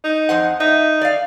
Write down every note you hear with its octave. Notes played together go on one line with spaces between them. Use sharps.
D#4
F2 C5 F#5
D#4 E5
D5 F5